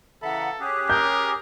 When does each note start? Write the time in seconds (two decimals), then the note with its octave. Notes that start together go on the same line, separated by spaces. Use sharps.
0.22 C#3 E3 A4 E5 F#5 A#5 B5
0.60 C#4 G4 G#4 F#6
0.90 A#4 G6